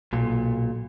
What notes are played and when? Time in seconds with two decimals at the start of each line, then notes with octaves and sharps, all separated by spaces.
0.13 B1 A#2